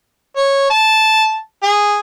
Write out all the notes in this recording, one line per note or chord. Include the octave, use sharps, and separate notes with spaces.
C#5
A5
G#4